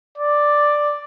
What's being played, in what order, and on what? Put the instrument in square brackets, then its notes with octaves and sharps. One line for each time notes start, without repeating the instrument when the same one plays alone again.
[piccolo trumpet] D5